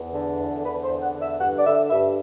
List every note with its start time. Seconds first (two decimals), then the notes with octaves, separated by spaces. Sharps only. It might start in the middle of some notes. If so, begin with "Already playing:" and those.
Already playing: E2
0.14 D3
0.39 E2
0.64 D3 B4
0.83 C5
0.89 E2
1.02 F#5
1.15 D3
1.21 E5
1.39 G2 F#5
1.58 D5
1.65 D3 E5
1.90 G2 E5